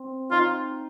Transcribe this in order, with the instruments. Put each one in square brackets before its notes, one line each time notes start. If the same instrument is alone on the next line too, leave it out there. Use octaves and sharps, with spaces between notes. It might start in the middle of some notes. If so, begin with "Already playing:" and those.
Already playing: [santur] C4
[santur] D#4 [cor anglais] F4